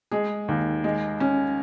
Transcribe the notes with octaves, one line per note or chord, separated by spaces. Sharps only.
G#3 G#4
D#2
G#3
C#4